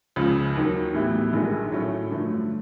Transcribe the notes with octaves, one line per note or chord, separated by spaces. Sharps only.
C#2 C#3 F3
D#2 D#3 F#3
A2 E3 G3 B3 E4
A#1 G#2 D#3 G#3
A2 F#3 A3 C#4
G2 D3 F3 A3